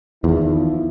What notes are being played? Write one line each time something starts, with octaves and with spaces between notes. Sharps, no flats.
E2 D#3 F3 E4